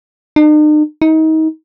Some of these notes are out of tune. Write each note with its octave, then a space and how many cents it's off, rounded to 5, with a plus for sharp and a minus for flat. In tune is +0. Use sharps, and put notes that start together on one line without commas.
D#4 -45
D#4 +30